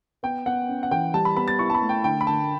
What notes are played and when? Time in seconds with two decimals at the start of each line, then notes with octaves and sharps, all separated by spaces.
0.23 B3 G5
0.46 B3 F#5
0.68 C#4
0.83 F#5
0.91 E3 G5
1.14 G3 A5
1.25 B5
1.36 B3 B5
1.48 A6
1.59 E4 C#6
1.70 A5
1.74 B5
1.82 A3
1.89 G5
2.04 D3 G5
2.21 B5
2.27 D3 A5